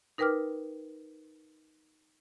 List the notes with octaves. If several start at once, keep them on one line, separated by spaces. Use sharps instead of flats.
D#4 A#4 B4 G5 D6 F6